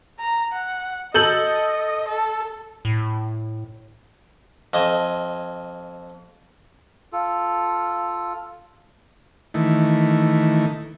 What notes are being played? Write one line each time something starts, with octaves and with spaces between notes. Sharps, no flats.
A#5
F#5
A4 D#5 G6 F#7
A4
A2
F2 D#5 G#5 A5
F4 A4
D#3 E3 A3